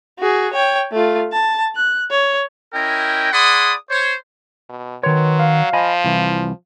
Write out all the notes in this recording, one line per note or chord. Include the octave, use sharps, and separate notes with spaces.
F#4 G#4
C#5 G5
A3 F4
A5
F#6
C#5
C#4 E4 A#4 D#5 G5
G#4 D5 F#5 B5 C6 D#6
C5 C#5
B2
D#3 F#3 B4 C#5 C6
F5
F3 D#5 G#5 B5
C2 E3